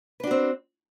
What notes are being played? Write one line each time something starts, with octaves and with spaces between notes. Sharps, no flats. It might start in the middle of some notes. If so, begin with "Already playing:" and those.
C4 D4 F#4 B4